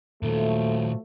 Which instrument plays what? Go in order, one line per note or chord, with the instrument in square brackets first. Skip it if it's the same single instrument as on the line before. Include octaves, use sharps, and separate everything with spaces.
[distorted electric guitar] A#2 D#3 [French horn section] F3 F#3 A3